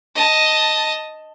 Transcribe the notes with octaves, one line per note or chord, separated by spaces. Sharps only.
D#5 A5